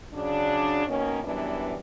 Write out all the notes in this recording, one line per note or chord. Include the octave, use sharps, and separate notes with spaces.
C#3 F#3 D4
B2 D#3 A#3 C#4
F#2 E3 G3 B3 D4